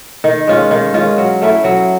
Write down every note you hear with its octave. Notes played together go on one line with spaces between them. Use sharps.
D#3
G#3 C#4 F4
D#3
G#3 C#4 F4
F#3
A3 C#4 E4
F#3